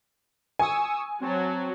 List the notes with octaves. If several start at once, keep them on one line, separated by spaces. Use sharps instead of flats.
G#5 C#6 D#6 E6
F#3 C4 F#4 C#5 A5